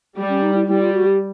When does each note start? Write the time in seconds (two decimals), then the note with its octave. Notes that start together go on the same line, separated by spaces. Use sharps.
0.17 G3
0.29 C#4
0.42 D#4
0.55 E4
0.68 G3 E4
0.81 F4
0.94 F#4
1.06 G4